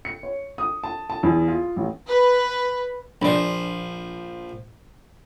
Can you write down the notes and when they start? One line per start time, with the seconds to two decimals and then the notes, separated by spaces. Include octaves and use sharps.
0.05 C#7
0.23 C#5
0.58 D#6
0.84 A5
1.10 A5
1.23 E2
1.48 F4
1.76 A1
2.07 B4
3.22 A#1 F3 D4 D5